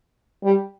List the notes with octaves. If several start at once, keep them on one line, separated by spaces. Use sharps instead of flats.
G3